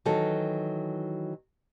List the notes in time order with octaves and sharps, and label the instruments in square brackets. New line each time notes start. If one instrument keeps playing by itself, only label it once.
[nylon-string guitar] D#3 E3 F#3 A4